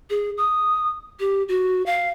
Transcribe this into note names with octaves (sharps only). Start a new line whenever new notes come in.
G#4
D#6
G4
F#4
F5